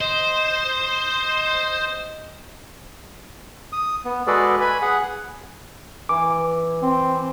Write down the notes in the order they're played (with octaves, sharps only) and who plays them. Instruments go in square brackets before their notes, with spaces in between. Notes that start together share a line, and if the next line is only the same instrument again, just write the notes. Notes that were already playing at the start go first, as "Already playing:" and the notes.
[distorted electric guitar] C5 [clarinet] D#5
[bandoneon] D#6
B3
G#3 F#4 G#4 A4 B4 D5
B4 G#5 B5
G#4 F#5
[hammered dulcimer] E3 [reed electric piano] D6
[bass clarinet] C4